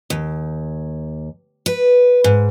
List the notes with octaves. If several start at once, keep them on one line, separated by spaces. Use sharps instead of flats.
D#2
B4
G#2